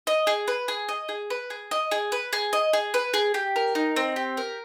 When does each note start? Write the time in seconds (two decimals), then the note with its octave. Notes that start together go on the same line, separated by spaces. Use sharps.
0.07 D#5
0.27 G#4
0.48 B4
0.68 G#4
0.89 D#5
1.09 G#4
1.30 B4
1.50 G#4
1.71 D#5
1.91 G#4
2.12 B4
2.33 G#4
2.53 D#5
2.73 G#4
2.94 B4
3.14 G#4
3.34 G4
3.56 A#4
3.75 D#4
3.96 C4
4.16 G4
4.37 A#4